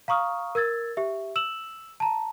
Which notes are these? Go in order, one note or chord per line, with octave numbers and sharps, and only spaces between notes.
F5 A#5 C#6 D#6 F6
A#4 E6 G#6 A6
G4 E5
E6 E7 F#7
A5 A#5